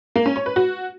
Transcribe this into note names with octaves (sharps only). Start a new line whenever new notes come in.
A#3
C#4
C#5
B4
F#4